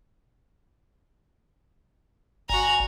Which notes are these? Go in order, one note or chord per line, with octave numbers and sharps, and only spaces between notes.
G1 F#4 G#5 A#5